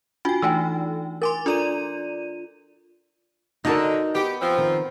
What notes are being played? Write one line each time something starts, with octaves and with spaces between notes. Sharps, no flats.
D4 F4 F#4 G5 G#5
E3 A3 D#4 G5 G#5 E6
A#4 G#5 C6 D6 A6
D4 F4 A4 D5 A#5 D#7
D3 D#4 F#4 A#4 D#5 A5
B3 G4
F3 C4
D#3